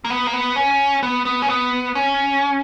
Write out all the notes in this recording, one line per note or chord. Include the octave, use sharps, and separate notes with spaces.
A#3
B3
A#3
B3
C#4
B3
B3
C#4
B3
C#4